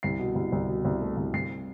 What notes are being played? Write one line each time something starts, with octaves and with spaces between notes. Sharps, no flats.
C2 C7
B2
C2
C2
B2
C2
A3
C2
C2 C7